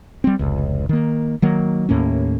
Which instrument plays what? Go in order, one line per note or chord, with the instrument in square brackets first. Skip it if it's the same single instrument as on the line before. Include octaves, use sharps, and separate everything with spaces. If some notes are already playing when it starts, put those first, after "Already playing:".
[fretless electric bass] G3 C4
F1 C#2
D#3 A#3
D#3 F#3 A#3
D#2 A2 A#3 C#4